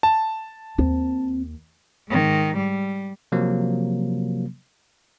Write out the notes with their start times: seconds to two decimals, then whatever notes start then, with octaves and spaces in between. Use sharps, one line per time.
0.03 A5
0.78 D#2 C4
2.09 G#2 D#3
2.57 G3
3.32 C3 F3 F#3 A#3